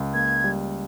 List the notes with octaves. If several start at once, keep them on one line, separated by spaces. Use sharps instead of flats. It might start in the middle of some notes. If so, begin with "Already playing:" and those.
Already playing: C#2
A#3 G#6
G3